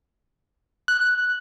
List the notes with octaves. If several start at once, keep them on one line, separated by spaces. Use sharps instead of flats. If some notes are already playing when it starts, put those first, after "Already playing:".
F#6